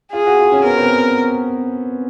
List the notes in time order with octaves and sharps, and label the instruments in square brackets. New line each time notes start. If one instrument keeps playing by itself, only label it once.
[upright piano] F4 [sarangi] G#4
[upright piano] F#4
F4
C#4
[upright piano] B3 [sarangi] A#4
[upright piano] C4
B3